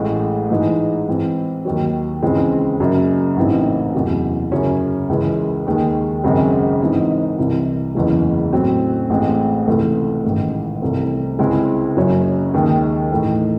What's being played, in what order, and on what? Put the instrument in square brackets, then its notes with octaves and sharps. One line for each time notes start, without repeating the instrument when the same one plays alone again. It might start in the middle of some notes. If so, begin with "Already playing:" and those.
Already playing: [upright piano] A1 A2 G#3
G#2 E3 G#3 D#4
G#2 E3 C4
D#2 D#3 F#3
C#2 C#3 E3 G#3 C4
F#1 F#2 C#3 F#3
A1 G#2 E3 C4 D#4
F#1 E2 C3 F#3
F#2 C#3 F#3 C#4
C#2 C#3 E3 G#3
D#2 D#3 G#3
G#1 F#2 C#3 G#3 C4
G#2 E3 C4 D#4
C2 C3 E3
F#1 E2 C#3 E3 G#3
A2 F#3 C4
A1 A2 G#3 C4
C#2 C3 E3 A3
A1 G#2 D#3
C2 C3 E3 A3 C4
C#2 C#3 G#3 C4 E4
F#1 F#2 C#3 F#3 C#4
D#2 D#3 G#3 D#4
A2 E3 A3 D#4